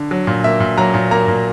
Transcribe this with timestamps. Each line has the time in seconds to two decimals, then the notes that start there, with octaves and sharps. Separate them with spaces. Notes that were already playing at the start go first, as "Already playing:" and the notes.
Already playing: D3
0.11 F#3
0.27 A#2
0.44 A#3 E5
0.60 A#2
0.78 F#3 A#5
0.94 A#2
1.11 A#3 A#5
1.28 A#2